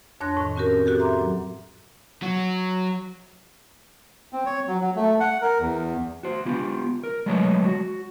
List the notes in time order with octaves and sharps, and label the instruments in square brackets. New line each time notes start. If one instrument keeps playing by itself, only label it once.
[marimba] F2 D4 C#5 C6 F#6 A#6
A2 D#3
C4 C#4 F#4 G4 A#4
F#4 G4 A4
E5 A#5 C6 D6
F#3
[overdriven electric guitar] F#3 F#4
[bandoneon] C4
C#5
F#3
F#3
A3
F#5
A#4
E2
[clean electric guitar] F#4 C5
B3 F4 G4
A#4
F#3 G#3 A3 A4 B4 C#5
F#4